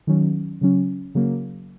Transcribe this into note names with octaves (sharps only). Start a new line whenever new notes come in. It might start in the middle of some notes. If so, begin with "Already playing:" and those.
D#3 F#3 C#4
C#3 F#3 C#4
C#3 F#3 A#3